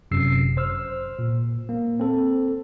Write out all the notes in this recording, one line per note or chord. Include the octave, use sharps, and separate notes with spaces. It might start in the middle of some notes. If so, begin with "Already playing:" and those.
G1 F#2 C3 E6 C7
C5 E6 F6
A#2
A#3
C4 A4